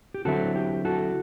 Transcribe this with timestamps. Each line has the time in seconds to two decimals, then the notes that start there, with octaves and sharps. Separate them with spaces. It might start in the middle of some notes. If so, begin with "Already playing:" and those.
0.14 G4
0.25 D3 F#3 C4 E4 F#4 A4
0.56 G4
0.85 F#4 A4